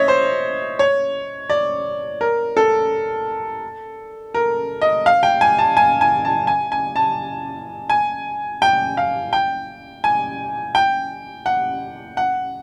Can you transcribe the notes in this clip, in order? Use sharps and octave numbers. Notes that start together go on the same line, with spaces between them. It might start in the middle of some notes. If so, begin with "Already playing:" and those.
Already playing: C#5 D#5 E5
C5
C#5
D5
A#4
A4
A#4
D#5
F5
G5
G#5
A5
G#5
G#5
A5
G#5
G#5
A5
G#5
G5
F5
G5
G#5
G5
F#5
F#5